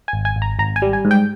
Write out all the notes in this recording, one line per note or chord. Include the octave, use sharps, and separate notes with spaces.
G#5
G#1
G#5
G#1
A#5
G#1 A#5
G#5
G3
G#5
G#2
G5